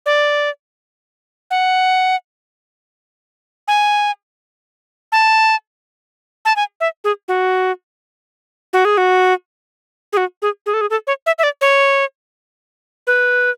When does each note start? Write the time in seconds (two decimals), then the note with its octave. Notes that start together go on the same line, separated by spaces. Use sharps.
0.06 D5
1.51 F#5
3.68 G#5
5.12 A5
6.45 A5
6.56 G#5
6.81 E5
7.04 G#4
7.28 F#4
8.73 F#4
8.85 G#4
8.98 F#4
10.13 G#4
10.17 F#4
10.42 G#4
10.66 G#4
10.74 A4
10.81 G#4
10.90 A4
11.07 C#5
11.26 E5
11.38 E5
11.43 D5
11.61 C#5
13.07 B4